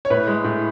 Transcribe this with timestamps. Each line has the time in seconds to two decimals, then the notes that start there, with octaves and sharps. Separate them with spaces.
0.05 C#5
0.10 A2 B4
0.27 G#3
0.44 A2